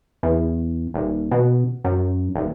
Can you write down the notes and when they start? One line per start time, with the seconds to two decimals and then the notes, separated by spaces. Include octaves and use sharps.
0.23 E2
0.94 D#1
1.31 B2
1.84 F#2
2.36 D#1